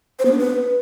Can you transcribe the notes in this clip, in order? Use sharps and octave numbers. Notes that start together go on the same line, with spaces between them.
C5
B3
D4
B4